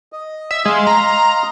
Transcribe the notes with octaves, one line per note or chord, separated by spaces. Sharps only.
D#5
E5
G#3 D#5 F5 C6
A#5